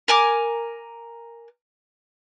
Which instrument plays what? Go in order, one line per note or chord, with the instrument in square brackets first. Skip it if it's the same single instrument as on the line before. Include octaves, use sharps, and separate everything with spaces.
[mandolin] A#4 G#5 D6